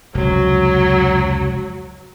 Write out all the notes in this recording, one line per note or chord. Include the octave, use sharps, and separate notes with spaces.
F1 C#2 F#3 F#4